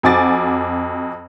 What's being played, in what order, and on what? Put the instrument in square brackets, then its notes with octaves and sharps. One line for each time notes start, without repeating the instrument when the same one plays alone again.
[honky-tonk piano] F2 F#4 G#5 D6 A6